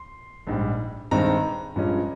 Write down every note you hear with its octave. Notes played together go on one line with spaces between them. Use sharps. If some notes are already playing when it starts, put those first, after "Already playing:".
Already playing: C6
A#1 G#2 G3
G2 D#3 G#3 C4 A#5
G2 F3 G#3 C#4